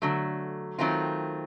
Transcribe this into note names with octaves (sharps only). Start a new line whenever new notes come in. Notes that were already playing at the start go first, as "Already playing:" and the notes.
D3 F#3 A3
D#3 F#3 A3 C4 F4